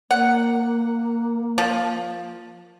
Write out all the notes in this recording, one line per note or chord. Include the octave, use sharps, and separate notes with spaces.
A#3 F#5
F3